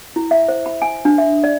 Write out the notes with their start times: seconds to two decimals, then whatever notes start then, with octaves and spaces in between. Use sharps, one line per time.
0.16 E4
0.31 E5
0.48 C5
0.66 B5
0.82 G#5
1.05 D4
1.18 E5
1.44 D5